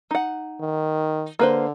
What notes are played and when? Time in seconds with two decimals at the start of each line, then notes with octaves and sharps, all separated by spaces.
0.11 D#4 F#5
0.60 D#3
1.39 D3 A#3 B4 C5